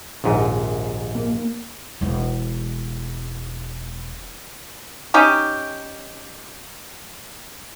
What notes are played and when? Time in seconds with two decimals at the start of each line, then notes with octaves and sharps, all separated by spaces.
0.24 A#1 D#2 G#2
1.15 A#3
2.01 E1 G#3
5.14 C#4 D#4 G4